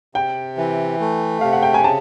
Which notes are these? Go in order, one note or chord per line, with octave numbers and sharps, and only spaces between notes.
C3 G5
E3
A3
C3 F5
F#5
G5
G#5
C#3 A5